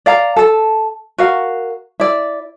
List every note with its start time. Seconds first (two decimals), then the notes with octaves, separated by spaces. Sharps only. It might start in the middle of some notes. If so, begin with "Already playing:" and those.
0.06 D5 F5 A#5
0.36 A4 A5
1.18 F#4 A#4 F5
2.00 E4 D5